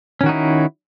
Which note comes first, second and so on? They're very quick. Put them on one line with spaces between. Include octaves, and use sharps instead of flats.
C#4 D#3 F#4 D#4 E4